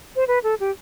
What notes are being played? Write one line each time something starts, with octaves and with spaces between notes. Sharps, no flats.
C5
B4
A4
G4